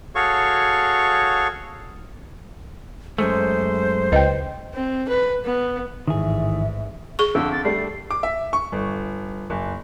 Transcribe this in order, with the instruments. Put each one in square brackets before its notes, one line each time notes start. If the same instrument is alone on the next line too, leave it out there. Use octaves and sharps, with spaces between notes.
[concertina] F#4 G#4 A4 C#5 F5 C#6
[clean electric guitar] F#2 G#3 A3 [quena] C5
[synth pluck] C#2 G5 [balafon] B4 D#5
[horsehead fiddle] C4
B4
B3
[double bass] A1 G#2 [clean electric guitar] D#3 E3 G#4 [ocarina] E5
[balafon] G#4 C#6
[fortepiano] F2 D3 [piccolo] E6
[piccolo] A6
[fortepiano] G3 A3 D4 [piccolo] C7
[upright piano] D6
E5
C#6
G1
F#1